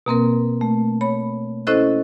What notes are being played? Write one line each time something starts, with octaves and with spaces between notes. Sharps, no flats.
B2 A#3 C4 A#4
A3
C#5 B5
C#4 E4 A4 C5 D#5 F#6